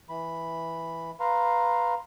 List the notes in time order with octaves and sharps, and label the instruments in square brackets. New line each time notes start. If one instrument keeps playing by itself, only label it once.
[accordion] E3 B5
B4 F5 A#5 C6